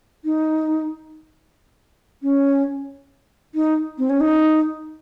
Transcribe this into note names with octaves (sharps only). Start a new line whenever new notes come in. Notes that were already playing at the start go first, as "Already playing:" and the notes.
D#4
C#4
D#4
C4
C#4
D#4